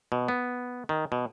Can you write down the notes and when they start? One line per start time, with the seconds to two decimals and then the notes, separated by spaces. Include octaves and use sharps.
0.12 B2
0.28 B3
0.89 D#3
1.12 B2